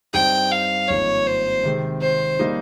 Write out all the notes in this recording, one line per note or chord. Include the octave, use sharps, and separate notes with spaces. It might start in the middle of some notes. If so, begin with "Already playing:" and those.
G2 G3 C4 D#4 G5
F5
G#1 G2 F3 A#3 D#4 C#5
C5
C3 D#3 G#3 C4
C5
G3 A#3 D#4